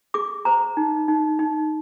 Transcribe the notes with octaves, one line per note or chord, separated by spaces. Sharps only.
G#4 D6
C5 A#5
D#4
D#4
D#4